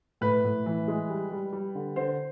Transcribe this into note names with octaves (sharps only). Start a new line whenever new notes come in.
A2 B4
A2
E3
G#3
G3
G3
G3
D3
D3 C5